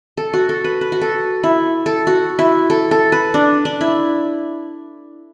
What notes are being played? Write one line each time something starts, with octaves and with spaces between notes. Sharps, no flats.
A4
F#4
A4
B4
B4
F#4
A4
E4
A4
F#4
E4
A4
A4
B4
D4
D4
E4